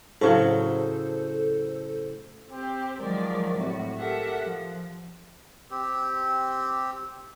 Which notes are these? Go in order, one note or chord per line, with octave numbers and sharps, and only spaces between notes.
A2 C#3 F#3 A4 C5
C4 G4 C5
D#3 F3 F#3 G#3 A#4 D5
A2 C3 F#4
G4 A4 A#4 E5 F#5
F3
C4 G4